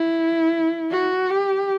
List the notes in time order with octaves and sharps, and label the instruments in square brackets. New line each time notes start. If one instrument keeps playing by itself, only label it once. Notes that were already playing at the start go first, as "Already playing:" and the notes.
Already playing: [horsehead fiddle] E4
F#4
G4